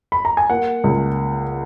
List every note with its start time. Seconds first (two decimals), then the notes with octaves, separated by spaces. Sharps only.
0.12 B5
0.25 A#5
0.37 G#5
0.50 A#3 F#5
0.84 C#2